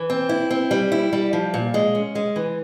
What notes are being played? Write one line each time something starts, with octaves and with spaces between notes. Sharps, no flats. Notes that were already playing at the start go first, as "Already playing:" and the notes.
Already playing: E3
C4
E4
C4
G3
E4
G3
F3
A#2
G#3
C#4
G#3
E3